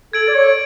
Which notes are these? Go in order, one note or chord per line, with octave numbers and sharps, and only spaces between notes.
A4 G#6 D7 F#7
D5
C#5